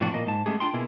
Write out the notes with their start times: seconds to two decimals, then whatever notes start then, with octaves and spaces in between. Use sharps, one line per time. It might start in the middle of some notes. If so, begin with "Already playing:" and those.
0.01 A2 C3 E3 F3 D4 F#4
0.14 A#2 A#3 D#5
0.27 G#2 A5
0.46 G#3 A3 B3 C#4 G4 G#4
0.60 D4 F4 G5 C6
0.74 B2 A#3 E4 G#4